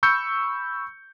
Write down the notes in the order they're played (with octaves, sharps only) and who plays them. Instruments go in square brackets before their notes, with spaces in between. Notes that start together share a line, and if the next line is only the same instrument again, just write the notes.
[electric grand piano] B5 C#6 E6 G6 C#7